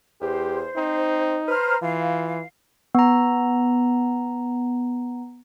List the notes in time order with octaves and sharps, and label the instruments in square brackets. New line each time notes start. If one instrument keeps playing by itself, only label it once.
[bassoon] E2 [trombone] G4 [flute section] C5
[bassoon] C4 [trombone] D#4
[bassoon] B4 [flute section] C5 A#5 F6
[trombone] E3 [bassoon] F4 [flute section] F5
[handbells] B3 A#5